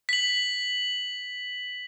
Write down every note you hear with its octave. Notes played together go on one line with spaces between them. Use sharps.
B6 F#7